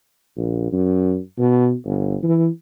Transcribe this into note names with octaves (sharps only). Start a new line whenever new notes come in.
A#1
F#2
B2
G1
E3